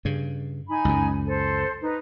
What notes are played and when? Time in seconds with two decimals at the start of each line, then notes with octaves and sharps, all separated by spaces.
0.05 G2 C#3
0.68 D#4 G#5 B5
0.85 C#2 F#2
1.25 A4 C5
1.81 D#4 B4